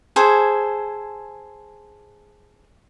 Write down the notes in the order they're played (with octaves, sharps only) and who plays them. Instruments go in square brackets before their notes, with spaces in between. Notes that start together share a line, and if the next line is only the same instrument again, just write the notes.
[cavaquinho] G#4 A4 C5 G#5